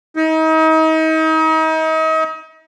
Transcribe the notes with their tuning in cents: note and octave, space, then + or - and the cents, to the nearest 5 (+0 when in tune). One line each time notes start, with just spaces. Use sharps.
D#4 +35